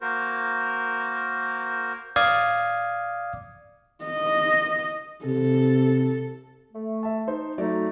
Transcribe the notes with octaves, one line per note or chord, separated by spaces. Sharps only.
A#3 F#4 A#4 C5
D5 F5 D#6 G#6
D#5
C3 A4
A3
E5 A5
D#4 C5
F#3 A3 D#4 D5